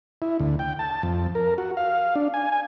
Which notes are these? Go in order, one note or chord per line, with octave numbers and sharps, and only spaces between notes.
E4
D2
G5
A5
F2
A#4
F#4
F5
D4
G#5
G#5